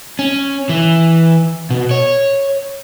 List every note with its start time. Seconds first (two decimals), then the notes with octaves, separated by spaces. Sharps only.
0.19 C#4
0.69 E3
1.70 B2
1.91 C#5